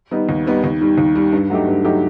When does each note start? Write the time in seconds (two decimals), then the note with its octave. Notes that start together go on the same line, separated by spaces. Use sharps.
0.11 D#3 G3 B3 D#4
0.29 D#2
0.46 D#3 G3 B3 D#4
0.64 D#2
0.81 D#3 G3
0.98 D#2
1.15 D#3 G3
1.33 G2
1.50 F#3 A3 D#4 G4
1.67 G2
1.85 F#3 A3 D#4 G4